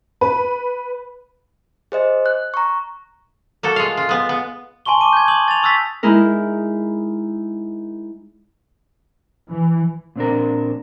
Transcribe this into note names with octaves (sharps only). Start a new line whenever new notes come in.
B4
G#4 C5 D#5
F#6
A#5 C#6
A#3 F#4 A4
G#3 F4 F5
F4
G#3 B3
B3
G#5 A5 C6 C#6 G7
C#6 D6 D#7
G6 G#6
D#6 F#7
A6 F7
C#6 D#6 E6 F#6 A6 B6
G#3 D#4 E4 A#4
E3
A#2 C4 D4 A#4